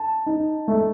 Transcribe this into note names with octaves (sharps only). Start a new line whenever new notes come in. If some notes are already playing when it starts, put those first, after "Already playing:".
Already playing: A5
D#4
A3